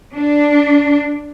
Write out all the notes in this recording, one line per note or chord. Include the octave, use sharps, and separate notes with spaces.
D4